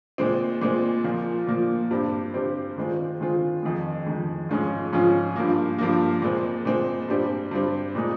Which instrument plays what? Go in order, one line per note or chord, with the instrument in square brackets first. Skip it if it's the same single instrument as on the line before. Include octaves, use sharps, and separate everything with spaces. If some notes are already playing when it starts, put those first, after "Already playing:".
[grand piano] A#2 G#3 C4
A#2 G#3 C4
A#2 F3 A#3
A#2 F3 A#3
G2 G3 C4
G2 G3 C4
D#3 G#3 C4 F4
D#3 G#3 C4 F4
F2 D#3 G#3
F2 D#3 G#3
G#2 F3 G#3 C#4 F4
G#2 F3 G#3 C#4 F4
G2 F3 A#3
G2 F3 A#3
A#2 G#3 C4
A#2 G#3 C4
G2 G3 C4
G2 G3 C4
A#2 G#3 D#4